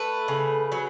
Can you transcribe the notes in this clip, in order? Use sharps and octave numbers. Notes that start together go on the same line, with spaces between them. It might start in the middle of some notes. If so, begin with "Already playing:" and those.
Already playing: A3 B4
C#3
F#3